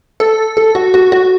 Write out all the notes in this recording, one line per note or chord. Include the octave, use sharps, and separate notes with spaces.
A4
A4
F#4
F#4
F#4